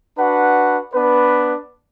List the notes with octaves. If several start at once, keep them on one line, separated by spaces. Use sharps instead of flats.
D4 F#4 B4 F#5
B3 D4 B4